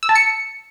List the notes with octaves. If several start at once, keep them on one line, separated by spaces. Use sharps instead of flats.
E6
A5
C#7